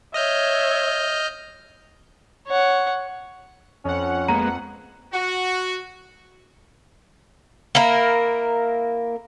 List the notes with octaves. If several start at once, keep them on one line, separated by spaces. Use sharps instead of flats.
C#5 D#5 E5 F6 G6
C#5 F#5
F2 C#4 F#5
G#3 A#3 B3 A#5
F#4
A#3 E4 A#4